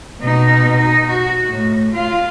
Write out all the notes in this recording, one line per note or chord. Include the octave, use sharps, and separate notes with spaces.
B2 D#4
D#4
F#4
A2
F4 F5